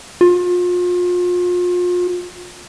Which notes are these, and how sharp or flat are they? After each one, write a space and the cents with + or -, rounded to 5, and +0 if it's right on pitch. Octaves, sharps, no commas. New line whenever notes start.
F4 +35